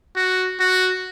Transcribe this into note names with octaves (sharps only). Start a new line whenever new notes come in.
F#4
F#4